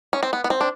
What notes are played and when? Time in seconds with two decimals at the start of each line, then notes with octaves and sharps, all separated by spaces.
0.13 C#4
0.23 C4
0.33 B3
0.44 B3
0.50 C4
0.61 D4